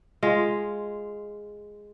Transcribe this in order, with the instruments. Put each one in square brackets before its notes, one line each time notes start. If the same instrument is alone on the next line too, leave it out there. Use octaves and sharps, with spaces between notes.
[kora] G#3 F4